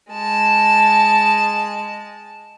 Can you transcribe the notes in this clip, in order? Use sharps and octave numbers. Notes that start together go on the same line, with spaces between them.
G#3 A5